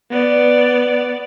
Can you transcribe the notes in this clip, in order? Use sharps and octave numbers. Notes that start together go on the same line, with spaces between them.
B3 D5